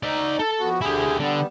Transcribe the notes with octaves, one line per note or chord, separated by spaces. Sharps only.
D#4 D5 E5
A4
F2 B3 F#4
D2 D3 E4 G4 G#4
D3 G3 B3